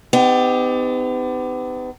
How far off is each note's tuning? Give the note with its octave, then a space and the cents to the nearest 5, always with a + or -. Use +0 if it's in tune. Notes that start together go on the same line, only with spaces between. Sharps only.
B3 +40 D#4 -15 G4 +15